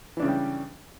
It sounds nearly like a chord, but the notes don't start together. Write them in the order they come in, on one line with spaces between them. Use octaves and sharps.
E3 D4 C#3 C#4 G3